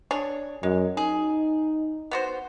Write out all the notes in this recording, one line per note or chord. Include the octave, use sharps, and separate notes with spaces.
D4 G#4 C#5
F#2 G#3
D#4 G#4
B3 F#4 C5